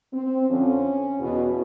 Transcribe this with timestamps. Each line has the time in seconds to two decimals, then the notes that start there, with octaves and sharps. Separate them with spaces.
0.14 C4
0.50 F2 D3 F3 C#4
1.20 E2 B2